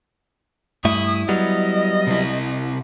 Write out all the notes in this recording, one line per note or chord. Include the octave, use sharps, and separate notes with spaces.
G2 A3 E4 E5 D#6
F#3 G3 B3 D#5
C3 E4